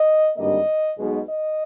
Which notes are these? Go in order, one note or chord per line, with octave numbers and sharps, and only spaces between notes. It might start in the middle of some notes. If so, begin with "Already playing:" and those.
Already playing: D#5
G#1 G2 D3 G3 A#3 D#5
B1 B2 G#3
D#5